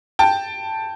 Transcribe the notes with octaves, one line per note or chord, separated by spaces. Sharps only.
G5 A5